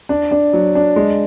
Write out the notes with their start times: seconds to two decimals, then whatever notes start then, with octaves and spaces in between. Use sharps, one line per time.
0.09 D4
0.31 D4
0.53 F#3
0.75 D4
0.96 G#3